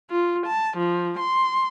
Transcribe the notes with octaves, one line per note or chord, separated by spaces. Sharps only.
F4
A5
F3
C6